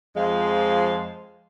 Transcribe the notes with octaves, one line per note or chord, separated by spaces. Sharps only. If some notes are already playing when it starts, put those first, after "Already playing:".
F2 F3 G#3 C5 F5